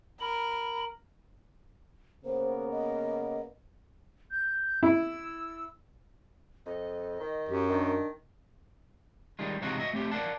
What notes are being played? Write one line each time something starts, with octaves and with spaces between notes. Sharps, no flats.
A#4 B5
C#3 A#3 B3 C5
D#5
G6
E4 E6
F2 D#5
D#3
F#2 G4
D#3 D4
D#3 G3 G#3 F4
G#2 C3 E3 D#4 F4 F#4
F#4 D#5 E5
A3 C4 G4 E5
A#4 D5 F5 F#5 A5